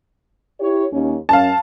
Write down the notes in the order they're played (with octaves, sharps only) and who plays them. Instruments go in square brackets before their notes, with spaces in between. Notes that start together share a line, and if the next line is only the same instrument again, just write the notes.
[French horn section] E4 G4 C#5
D#2 C#4
[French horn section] F#2 C#4 [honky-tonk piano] F5 A5